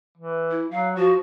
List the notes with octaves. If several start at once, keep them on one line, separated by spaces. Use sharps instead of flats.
E3
E4
F#3 F5
F3 F#4